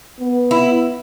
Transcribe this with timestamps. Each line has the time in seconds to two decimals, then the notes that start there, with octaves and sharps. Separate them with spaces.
0.20 B3
0.51 E4